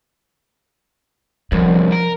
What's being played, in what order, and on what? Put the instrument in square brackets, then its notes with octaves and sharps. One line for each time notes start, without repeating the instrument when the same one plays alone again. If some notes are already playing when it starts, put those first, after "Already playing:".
[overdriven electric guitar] C2 F#2 [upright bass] F3
[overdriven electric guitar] A#4